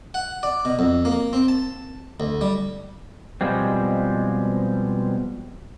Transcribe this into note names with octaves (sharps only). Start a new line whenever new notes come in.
F#5
D5
B2
F2
A#3
C4
A5
D2
G3
B2 F3 G3 G#3 C4